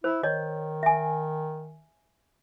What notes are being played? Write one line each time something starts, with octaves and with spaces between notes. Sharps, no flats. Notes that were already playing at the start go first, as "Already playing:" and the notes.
E4 C5
D#3 C#5 D#5
E5 G#5